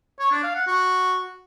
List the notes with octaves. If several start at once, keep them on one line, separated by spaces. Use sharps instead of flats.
C#5
D4
F5
F#5
F#4